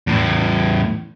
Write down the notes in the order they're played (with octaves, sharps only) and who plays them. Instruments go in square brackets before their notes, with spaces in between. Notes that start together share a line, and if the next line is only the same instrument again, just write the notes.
[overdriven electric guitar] E2 A2